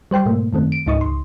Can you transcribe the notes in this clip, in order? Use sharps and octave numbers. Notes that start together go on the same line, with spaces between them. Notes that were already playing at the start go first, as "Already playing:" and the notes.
G3 C5 G5 C6
G#2 B2 A3 A#3
F#2 D#3 A3 C4
D7
C#2 G#2 D#4 D#5 C#6 D#6
C#2 C6